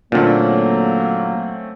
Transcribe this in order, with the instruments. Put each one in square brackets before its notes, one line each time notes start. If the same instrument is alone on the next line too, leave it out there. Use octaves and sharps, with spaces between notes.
[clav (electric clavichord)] A#2 D3 [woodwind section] F#3 A#3 [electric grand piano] A3 C4 C#4